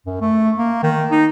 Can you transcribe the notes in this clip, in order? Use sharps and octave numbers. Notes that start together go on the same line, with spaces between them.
F#2
A3
A#3
D#3
D#4